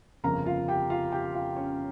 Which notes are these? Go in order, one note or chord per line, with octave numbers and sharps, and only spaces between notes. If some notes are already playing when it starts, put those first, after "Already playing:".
G1 F2 C#3 A#4 A#5
F4 F5
G4 G5
F4 F5
G4 G5
F4 F5
C#4 C#5